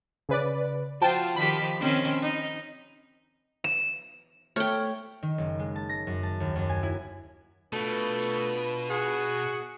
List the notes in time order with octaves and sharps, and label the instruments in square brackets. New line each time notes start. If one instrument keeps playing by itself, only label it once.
[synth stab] C#3 B4 D5
[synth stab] F3 G5 A5 [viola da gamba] F4 F#4
[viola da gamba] D#3 F3 G4 [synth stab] B5 B6
[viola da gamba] D#3 C4 C#4
D#4
[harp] E7
[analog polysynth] A3 [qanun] C#5 G5 [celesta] F6
[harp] D#3
F#1
G#3
A5
A#6
F#2
A5
D#2
F#2
G#5
E4
[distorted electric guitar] B2 [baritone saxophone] A3 [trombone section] D4 F4 B4
[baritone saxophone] F#4 [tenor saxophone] G#4